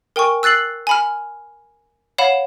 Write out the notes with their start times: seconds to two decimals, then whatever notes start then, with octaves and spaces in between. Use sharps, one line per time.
0.16 A#4 G5 G#5 C#6
0.43 E6 F#6 A6 C7 F#7
0.87 G#5 B5 F6
2.18 C#5 F5 F#5 B5 E7